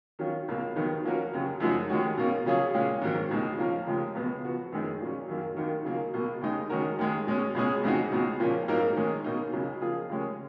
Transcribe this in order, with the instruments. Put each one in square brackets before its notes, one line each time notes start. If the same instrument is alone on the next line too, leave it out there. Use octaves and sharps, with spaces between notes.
[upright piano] D#3 F#3 C#4 F4
C#2 B2 A#3 F4
D#2 D#3 F#3 B3 D#4
F3 A#3 C#4 F#4 A#4
D#2 C#3 F#3
F#2 F3 G#3 D#4 F#4
D#2 D#3 G#3 C#4 F#4
B2 A#3 C#4
C#3 F#3 C#4 F4 G#4
A#2 G#3 C#4 F4
G#2 D#3 F#3
C#2 B2 G#3 D#4
F3 A#3 C#4 F4 A#4
D#2 C#3 F3 G#3
C#2 B2 F#3 B3
F3 B3 F#4
F#2 D#3 G#3 D#4 G#4
A#2 F#3 C#4
F#2 D#3 F#3 A#3
D#2 D#3 A#3 D#4 F#4
C#3 F#3 A#3 F4
C#2 B2 A#3
D#2 C#3 G#3 D#4
D#3 G#3 C#4 F#4 A#4
D#2 D#3 G#3
B2 G#3 C#4
C#2 B2 G#3 C#4 G#4
F2 C#3 G#3 D#4 F#4
C#2 B2 G#3
A#2 F3 A#3 C#4
G#2 F#3 A#3 D#4 A#4
D#3 G#3 C#4
B2 A#3 D#4
C#2 C#3 F#3
F3 A#3 F4 G#4
D#2 C#3 G#3 C#4